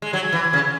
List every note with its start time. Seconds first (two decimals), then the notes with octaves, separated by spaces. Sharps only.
0.02 G#3
0.13 F#3 G#6
0.33 E3
0.53 C#3